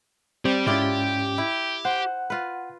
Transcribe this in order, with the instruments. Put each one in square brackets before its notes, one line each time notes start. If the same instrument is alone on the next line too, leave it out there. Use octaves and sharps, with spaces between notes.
[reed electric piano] C4 [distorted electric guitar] G4 D5
[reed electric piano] G#2 C#4 [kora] E4 F4 D5 [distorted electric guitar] G4
[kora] E4
[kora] C5 [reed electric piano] F#5 F#6
[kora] F4 B4